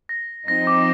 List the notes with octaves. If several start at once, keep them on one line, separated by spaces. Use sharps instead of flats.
A#6
F3 C4 D#4 A#6
D6